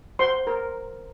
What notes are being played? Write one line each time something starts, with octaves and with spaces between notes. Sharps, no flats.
F#4 C5 C6
A#4